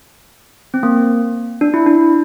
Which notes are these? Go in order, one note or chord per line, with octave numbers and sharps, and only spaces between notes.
C4
A#3
D4
E4
D4